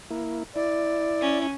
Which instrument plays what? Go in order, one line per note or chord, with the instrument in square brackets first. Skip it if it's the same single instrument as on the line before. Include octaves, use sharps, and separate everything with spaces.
[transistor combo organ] A#3 E4
[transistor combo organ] E4 [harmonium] D5
[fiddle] C#4